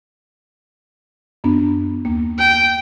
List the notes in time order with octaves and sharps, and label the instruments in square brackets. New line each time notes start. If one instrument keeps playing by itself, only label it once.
[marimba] F#2 B3 D4
D#2 A#3
[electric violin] G5